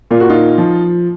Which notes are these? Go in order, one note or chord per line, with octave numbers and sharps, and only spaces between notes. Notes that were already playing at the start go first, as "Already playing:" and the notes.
A#2 F4
F#4
D#4 F4
F3